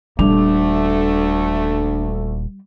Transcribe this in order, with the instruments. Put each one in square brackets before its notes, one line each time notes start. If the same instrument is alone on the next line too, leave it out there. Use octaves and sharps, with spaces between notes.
[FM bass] D#1 [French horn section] D2 A3 [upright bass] G3 [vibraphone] D4